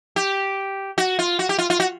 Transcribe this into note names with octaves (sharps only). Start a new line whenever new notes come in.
G4
F#4
F4
F#4
G4
F4
F4
F#4